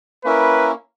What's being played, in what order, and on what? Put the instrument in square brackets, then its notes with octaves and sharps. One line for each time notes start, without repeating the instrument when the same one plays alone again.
[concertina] A#3 C#4 E4 A#4 [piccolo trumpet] B4